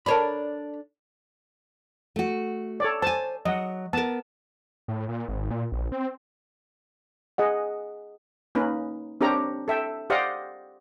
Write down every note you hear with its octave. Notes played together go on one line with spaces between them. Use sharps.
D4 A4 A#4 C#5 D5 B5
A3 F#4
A4 C#5 D5
C5 G#5 A5
F#3 D#5 F#5
B3 A#4 A5
A2
A#2
G#1
A#2
A#1
C4
G#4 D#5 F#5
A#3 C#4 D#4 B4
C4 D4 G4 A#4 C#5 A#5
A4 E5 G5
G4 C5 D5 D#5 F5 F#5